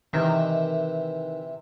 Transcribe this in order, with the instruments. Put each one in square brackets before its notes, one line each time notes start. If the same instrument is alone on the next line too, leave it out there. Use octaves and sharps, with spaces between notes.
[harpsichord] C3 E3 [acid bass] D#3